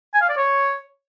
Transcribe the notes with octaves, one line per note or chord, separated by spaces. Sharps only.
G#5
F5
D5
C#5